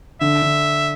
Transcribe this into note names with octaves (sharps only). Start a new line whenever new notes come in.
D3 E5
D3